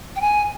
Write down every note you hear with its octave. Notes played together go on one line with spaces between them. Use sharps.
G5
G#5